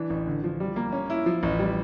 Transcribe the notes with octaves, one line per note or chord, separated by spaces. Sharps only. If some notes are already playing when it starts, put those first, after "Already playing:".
Already playing: E3 D4
A1
D3
F3
G3
A#3
C#4
E4
F3
A1
G3